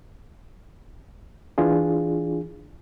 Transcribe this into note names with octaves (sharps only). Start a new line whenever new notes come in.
E3 D4 F4 G#4